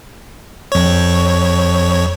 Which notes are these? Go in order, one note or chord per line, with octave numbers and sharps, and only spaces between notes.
F2 C#5